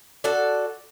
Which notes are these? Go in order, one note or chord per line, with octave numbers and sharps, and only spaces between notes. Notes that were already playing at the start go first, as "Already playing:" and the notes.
F#4 A4 D5